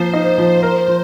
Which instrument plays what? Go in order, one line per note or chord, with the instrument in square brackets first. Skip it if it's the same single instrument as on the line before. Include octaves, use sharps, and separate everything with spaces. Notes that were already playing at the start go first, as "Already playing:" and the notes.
Already playing: [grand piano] F3 A#3 [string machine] C5
[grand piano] D#4 [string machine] C5
[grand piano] F3
[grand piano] A#4 [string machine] C5
[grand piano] F3